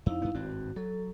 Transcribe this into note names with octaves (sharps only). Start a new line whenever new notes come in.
F2 D#4 E4 F5
G2 B3
G#1 G2 C4 F#4
F#3 A4